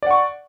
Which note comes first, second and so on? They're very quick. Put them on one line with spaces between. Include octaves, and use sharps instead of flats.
D5 F#5 C#6